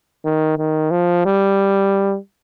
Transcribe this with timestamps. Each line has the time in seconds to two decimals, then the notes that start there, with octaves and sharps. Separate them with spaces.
0.25 D#3
0.58 D#3
0.91 F3
1.26 G3